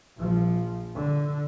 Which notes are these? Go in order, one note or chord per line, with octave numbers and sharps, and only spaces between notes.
A#1 F3
D3